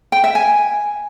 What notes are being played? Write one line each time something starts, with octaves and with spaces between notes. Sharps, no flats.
G5
E5
G#5